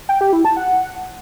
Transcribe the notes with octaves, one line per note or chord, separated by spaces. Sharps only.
G5
G4
E4
A5
F#5